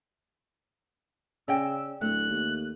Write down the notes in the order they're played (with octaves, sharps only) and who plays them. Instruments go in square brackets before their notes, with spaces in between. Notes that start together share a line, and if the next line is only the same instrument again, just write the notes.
[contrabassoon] C#3 [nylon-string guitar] C#4 [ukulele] D5 D#5 G5 [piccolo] E6
[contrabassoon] D1 [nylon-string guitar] A3 [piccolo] F#6
[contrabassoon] D#2